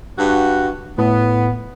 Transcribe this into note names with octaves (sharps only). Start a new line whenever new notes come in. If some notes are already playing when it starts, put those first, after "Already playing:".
G2 F#4
A2 B3